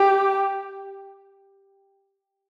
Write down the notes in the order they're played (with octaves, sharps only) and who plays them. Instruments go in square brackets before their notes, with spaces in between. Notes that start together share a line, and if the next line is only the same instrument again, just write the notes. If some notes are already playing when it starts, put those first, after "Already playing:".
Already playing: [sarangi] G4